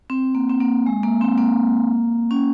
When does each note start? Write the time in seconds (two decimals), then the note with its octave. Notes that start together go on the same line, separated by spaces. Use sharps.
0.10 C4
0.35 A#3
0.50 C4
0.61 A#3
0.86 G#3
1.03 A#3
1.21 C4
1.38 A#3
2.31 C#4